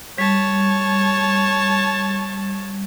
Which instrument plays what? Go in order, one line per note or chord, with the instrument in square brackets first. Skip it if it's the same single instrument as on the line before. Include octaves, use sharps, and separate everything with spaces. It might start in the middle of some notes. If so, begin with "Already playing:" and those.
[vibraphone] G3 [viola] C#5 A5